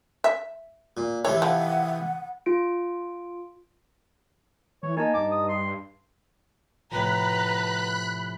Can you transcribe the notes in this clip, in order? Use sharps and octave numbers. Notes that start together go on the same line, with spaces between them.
E5
A#2
C3 E3 A4 C#5
F3 F#5
F4 D7
E3 C#5
A#3 D#4 D#5 G#5 A5
G2 D6
D#6
C6
A2 C3 F3 B4 F#5 A#5 B5 F#6